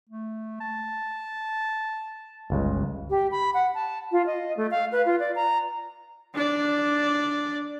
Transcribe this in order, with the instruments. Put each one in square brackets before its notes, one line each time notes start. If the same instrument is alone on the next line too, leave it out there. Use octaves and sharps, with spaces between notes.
[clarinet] A3
A5
[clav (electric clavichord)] G1 C#2 G#3 [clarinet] G3
[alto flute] G4
B5
F#5
A5
F4
D#5
A3
F5
B4
F4
D5
A#5
[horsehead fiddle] D4 D5